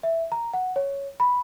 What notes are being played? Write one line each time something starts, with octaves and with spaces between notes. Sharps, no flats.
E5
A#5
F#5
C#5
B5